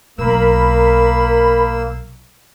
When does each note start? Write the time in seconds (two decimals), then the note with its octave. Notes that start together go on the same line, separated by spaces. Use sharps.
0.18 B1 A#3 A#4 B5 E6